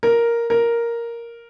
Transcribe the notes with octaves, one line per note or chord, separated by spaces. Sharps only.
A#4
A#4